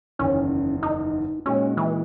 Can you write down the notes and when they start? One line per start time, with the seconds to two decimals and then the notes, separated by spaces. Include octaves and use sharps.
0.19 F#1 E2 D#3 C#4
0.83 D#4
1.46 A#2 G#3 C#4 D#4 F#4
1.77 E3